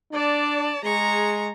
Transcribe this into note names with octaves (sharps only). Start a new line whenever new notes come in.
D4 D5 A5
G#3 G#4 A#5 C#6